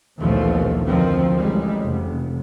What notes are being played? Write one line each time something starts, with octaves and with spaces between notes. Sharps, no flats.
A#1 D#2 B2 E3 F3 A3
F1 D2 D#3 F3 C4
A1 G3 G#3
F1